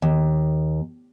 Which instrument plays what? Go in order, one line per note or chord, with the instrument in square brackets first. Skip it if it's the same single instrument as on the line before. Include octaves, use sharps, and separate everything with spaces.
[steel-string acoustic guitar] D#2